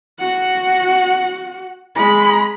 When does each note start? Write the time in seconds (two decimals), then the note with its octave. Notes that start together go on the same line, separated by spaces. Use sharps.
0.19 F#4 F#5
1.95 G#3 B5